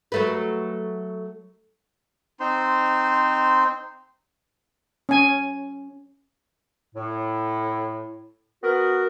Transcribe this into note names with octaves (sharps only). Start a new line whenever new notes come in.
F#3 A3 B4
C4 D#4 C5 C6
C#4 G#5
A2
B3 F#4 A#4